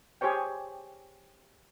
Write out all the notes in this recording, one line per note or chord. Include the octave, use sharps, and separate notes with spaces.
G4 G#4 C5 C#5 G5